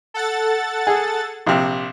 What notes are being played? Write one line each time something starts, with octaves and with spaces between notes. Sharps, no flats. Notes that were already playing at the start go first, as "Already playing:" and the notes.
A4 F#5 A6
G#4
A#1 C3